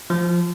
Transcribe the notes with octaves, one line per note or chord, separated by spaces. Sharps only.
F3